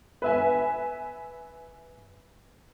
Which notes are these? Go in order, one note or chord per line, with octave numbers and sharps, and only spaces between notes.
B4 E5 G#5